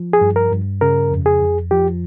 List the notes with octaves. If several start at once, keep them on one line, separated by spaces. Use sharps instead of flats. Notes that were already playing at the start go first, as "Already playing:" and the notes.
Already playing: F3
G#4
G2
A#4
G2
C#3 A#4
F2
G#4
F2
F3 G4